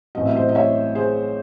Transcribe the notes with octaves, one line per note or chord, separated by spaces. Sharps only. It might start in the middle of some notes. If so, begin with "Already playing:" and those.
A1 A2 F#3 C4 D#5
E5
C5 D#5
D#5
C#5 E5
G#4 C5